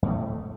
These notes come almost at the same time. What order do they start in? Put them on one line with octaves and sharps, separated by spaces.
F2 A2 A3